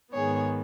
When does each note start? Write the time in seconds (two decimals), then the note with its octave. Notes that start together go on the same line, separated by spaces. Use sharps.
0.13 G#2 D#3 B3 G#4 C#5